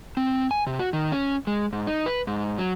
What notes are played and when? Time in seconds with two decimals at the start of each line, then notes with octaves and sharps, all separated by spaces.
0.17 C4
0.51 G#5
0.67 C3
0.79 F#4
0.93 D#3
1.12 C#4
1.47 G#3
1.73 G#2
1.87 D#4
2.06 B4
2.27 G#2
2.58 F#3